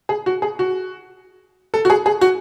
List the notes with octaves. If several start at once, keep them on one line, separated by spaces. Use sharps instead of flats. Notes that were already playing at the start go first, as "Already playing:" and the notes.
G#4
F#4
G#4
F#4
A4
F#4
G#4
G#4
F#4